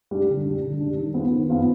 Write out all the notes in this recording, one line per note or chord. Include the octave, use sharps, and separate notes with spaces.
G3 D4
D3
G3 D4
D3
G3 D4
D#3
B3 F4 C5
D#3
B3 F4 C5